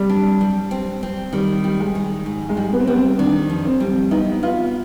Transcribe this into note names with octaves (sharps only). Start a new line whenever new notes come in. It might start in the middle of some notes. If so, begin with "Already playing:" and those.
Already playing: C3 G3
D4
G3
C4
C4
D#3 G3
G3
G#3
D#3
G#2
G#3
G3
B3
C4
G3 B3
C4
D#3 D4
F2
C4
G3
B3 D#4
B3 F4